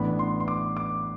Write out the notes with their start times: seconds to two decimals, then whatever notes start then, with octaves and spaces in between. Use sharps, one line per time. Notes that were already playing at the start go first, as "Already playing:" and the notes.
Already playing: A1 A2 E3 B3 D4 B5
0.19 C6
0.40 C6
0.48 D6
0.77 D6